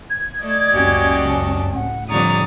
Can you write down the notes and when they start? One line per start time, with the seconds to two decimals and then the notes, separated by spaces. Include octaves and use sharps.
0.10 G#6
0.43 A3 D5 D#5
0.72 C#2 F#2 A#3 C#4 F#4 G4
1.28 A5
1.75 A2 F#5
2.10 F2 D3 G3 C#5 A#5 D#6 A6